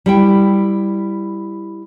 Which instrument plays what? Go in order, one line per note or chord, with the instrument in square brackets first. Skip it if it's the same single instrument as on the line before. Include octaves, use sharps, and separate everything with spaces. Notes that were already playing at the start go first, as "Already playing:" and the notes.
[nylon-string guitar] G3 E4 G5